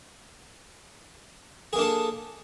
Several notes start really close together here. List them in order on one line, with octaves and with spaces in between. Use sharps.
G#4 A#3 D4 A4